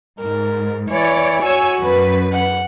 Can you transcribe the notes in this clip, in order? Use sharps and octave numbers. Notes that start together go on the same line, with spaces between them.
G#2 A#4
E3 C#5 D5
F#4 C#5 G#5 E6
F#2 B4
F#5